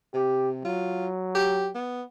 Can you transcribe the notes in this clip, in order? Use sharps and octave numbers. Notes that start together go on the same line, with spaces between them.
C3 G4
F#3 F4
G4
B3